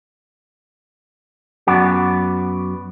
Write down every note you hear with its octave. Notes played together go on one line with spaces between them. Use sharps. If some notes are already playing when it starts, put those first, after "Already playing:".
F#2 B3 F#4 D5